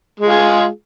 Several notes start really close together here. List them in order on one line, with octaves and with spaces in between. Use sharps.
G#3 F4 G#4